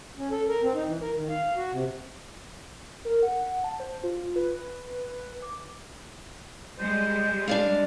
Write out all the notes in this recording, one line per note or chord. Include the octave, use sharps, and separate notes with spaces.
C#4
A4
A#4
C4
D#4
E3
A#4
D#3
F5
F5
F#4
C3
A#4
F#5
A5
C5
F4
B4
D6
G3 G#3 C5
D4 D5 F5